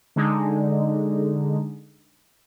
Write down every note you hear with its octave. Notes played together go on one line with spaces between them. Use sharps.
D3 G#3 D#4